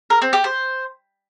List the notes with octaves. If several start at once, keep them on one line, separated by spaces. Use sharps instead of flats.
A#4
C4
G4
C5